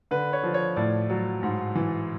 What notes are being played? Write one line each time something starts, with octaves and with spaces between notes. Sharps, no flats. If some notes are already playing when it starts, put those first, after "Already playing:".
D3 B4
C#5
F3
C#5
A2 D5
F#3
G#2
E3